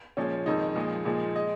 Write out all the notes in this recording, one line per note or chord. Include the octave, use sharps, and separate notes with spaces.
A#2 F3 G#3 C#4
F2 D#3 G#3 D#4
A#2 F3 G#3
A#2 F3 G#3
G#3 D#5